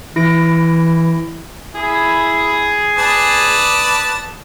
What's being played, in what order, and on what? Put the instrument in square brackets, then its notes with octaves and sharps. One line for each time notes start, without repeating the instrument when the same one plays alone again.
[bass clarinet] E3 [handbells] E4 A#6 D7
[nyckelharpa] E4 B5 [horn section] G#4
[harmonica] B4 D5 A5 [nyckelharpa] D#6